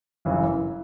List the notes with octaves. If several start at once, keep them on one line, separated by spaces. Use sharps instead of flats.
G1 F#2 C#3 E3